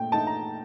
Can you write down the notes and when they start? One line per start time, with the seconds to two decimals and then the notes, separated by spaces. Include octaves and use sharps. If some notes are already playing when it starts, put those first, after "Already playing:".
Already playing: A#2 A3 G5
0.12 A#2 A3 D#4 A5
0.27 A#5